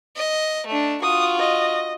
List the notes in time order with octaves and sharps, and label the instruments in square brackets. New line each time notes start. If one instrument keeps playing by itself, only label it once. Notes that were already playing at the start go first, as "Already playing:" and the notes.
[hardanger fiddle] D#5
A3 D4
[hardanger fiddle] F4 F#4 [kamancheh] D#6
[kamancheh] D#5